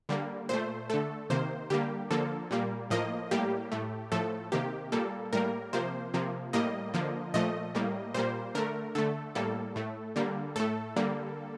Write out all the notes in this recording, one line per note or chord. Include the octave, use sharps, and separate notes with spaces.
D3 G3 A#3
A#2 A3 C5
D3 A3 A4
C3 D#3 A#3 C5
D3 G3 A#3 G4
D3 F3 A#3 A4
A#2 G3 A#3
A2 F3 A#3 D#5
A2 G3 A#3 G4
A2 A3
A2 F3 A3 A4
C3 D#3 A#3 G4
A#2 G3 A#3 A4
A2 G3 A#3 A#4
C3 F3 A#3 C5
C3 F3 A#3
A2 G3 A#3 D#5
D3 F3 A#3
A#2 F3 A3 D#5
A2 G3 A#3
A#2 G3 A#3 C5
D3 A3 A#4
D3 A3 A4
A2 G3 A#3 A4
A2 A3
D3 G3 A#3
A2 A3 A4
D3 G3 A#3